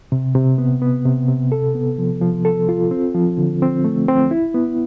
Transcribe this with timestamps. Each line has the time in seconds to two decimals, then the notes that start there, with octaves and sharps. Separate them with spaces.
0.12 C3
0.35 C3
0.58 B3
0.82 B3
1.05 C3
1.28 C3
1.52 A4
1.75 B3
1.98 F3
2.21 F3
2.45 A4
2.69 F4
2.91 C4
3.15 F3
3.38 D3
3.62 C4
3.84 A3
4.08 C4
4.31 E4
4.54 B3